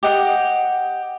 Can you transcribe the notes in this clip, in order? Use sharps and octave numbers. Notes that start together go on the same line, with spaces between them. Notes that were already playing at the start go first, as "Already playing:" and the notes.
G4 D#5 F#5